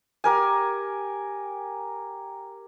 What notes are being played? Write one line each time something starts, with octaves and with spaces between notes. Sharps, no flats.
G4 A#4 G#5